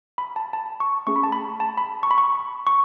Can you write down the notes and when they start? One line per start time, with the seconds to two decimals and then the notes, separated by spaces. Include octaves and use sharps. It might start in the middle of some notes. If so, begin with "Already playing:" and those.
0.18 B5
0.36 A5
0.53 A5
0.80 C#6
1.07 A3 C#4 G#4 C#6
1.16 B5
1.23 A5
1.32 B5
1.60 A5
1.77 B5
2.03 C#6
2.11 B5
2.18 C#6
2.67 C#6